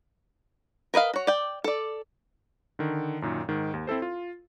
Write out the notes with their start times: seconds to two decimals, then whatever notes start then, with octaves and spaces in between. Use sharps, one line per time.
0.94 A#4 B4 D#5 F5
1.14 F#4 C#5
1.27 D5 G5
1.64 A4 D5
2.79 D3 D#3
3.22 F#2 A#2 D#3
3.48 G#2 D#3
3.74 D#2
3.87 C4 E4 A4 C5
4.02 F4